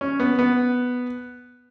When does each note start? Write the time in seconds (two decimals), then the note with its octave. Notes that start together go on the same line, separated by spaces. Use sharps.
0.01 C#4
0.20 B3
0.39 B3